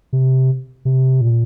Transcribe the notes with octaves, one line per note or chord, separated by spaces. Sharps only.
C3
C3
A#2